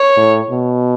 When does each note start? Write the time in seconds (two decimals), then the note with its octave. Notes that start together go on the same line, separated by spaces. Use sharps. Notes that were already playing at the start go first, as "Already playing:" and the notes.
Already playing: C#5
0.17 A2
0.50 B2